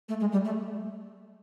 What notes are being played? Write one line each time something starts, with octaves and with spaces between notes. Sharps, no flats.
A3
G#3
G3
A3